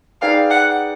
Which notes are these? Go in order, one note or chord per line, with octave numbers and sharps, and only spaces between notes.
D#4 G#4 B4 D5 F5 G5
F#5